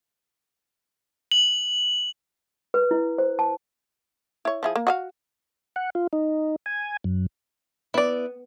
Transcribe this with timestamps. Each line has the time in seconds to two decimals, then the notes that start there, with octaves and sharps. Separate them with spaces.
1.32 F#7
2.74 B4
2.91 E4
3.18 C5
3.39 A5
4.45 E4 C#5
4.63 F3 E4 G#4
4.76 A#3
4.87 F#4 D#5 F5
5.76 F#5
5.95 F4
6.13 D#4
6.66 G#5
7.04 F#2
7.94 B3 E4 D5